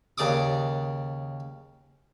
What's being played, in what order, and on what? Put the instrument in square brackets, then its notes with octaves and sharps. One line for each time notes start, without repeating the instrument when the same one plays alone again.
[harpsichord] D#2 C#3 D5 D6 D#6